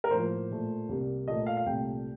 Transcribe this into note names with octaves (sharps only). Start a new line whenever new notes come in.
A#4
A2 F3 A#3 C5
A#2 A3
C2 C3 G3 A#3
A#2 A3 D#5
F5
F5
C2 A#2 A3 G5